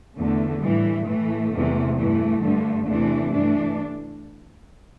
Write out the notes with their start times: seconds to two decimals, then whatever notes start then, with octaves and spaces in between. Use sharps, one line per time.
0.16 E2 D3 A3
0.62 A2 E3 G3
1.06 A2 E3 A3
1.52 E2 C3 E3
1.97 G2 E3 A3
2.42 G2 D3
2.87 E2 C3 E3 A3 D4
3.32 G2 E3 A3 D4